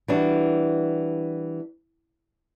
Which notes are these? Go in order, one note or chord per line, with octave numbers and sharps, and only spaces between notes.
E3 G3 D4 F#4